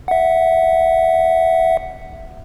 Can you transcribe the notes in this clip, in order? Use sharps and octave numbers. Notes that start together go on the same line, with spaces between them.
E5 F#5